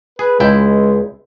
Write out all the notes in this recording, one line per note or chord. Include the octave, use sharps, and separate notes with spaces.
G#4 B4
C#2 G#3 E4 G5